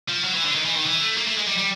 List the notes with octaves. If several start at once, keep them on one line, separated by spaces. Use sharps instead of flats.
F3
F#3
E3
D3
D#3
E3
D#3
E3
A3
A#3
A3
G#3
G3
G3